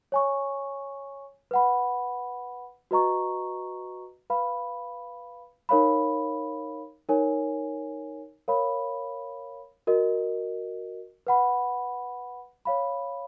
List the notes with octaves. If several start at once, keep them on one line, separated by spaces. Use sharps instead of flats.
C#5 G#5 C#6
B4 F#5 B5
F#4 B4 D#5 A#5 C#6
B4 F5 B5
D#4 A#4 C#5 F5 B5
D#4 A#4 C#5 G#5
A#4 C#5 F5 B5
F#4 A#4 D#5
B4 F#5 B5
C#5 F5 B5